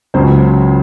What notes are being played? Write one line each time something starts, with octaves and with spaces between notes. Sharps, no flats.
C#2 C#3 F#3 C5